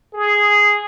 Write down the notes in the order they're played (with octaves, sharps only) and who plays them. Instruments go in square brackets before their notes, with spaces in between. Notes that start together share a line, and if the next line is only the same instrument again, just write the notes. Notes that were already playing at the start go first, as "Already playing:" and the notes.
[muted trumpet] G#4